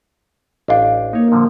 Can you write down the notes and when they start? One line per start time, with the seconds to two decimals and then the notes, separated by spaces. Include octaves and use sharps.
0.68 A1 D4 D#5 F5 G5
1.13 A#3 D#4 C#5
1.32 A#2 D3 F3